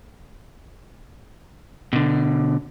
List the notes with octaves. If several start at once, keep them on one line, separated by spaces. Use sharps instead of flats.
B2 D3